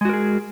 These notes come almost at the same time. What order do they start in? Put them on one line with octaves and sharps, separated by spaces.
G#3 F#4 A#4 G#4